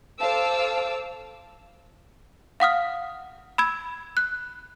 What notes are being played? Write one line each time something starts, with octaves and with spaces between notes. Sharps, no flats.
A4 C5 F5 A5 D6 E6
F5 F#5 D#6 F6
B5 E6 G#6
F#6